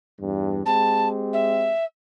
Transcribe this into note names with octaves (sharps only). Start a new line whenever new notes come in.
E2 G2
G#3 C4 G4 A5
E5